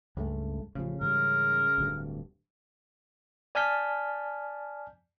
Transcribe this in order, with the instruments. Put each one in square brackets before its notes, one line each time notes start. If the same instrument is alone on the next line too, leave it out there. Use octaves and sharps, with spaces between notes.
[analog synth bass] C#2 [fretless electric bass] G2 G#3 A3
[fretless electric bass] A1 F3 [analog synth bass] C#3
[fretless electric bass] G#2 E3 G3 [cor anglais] A#4
[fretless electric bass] D1 D2 G2
[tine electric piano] D5 G#5 A5 F6 G6 B6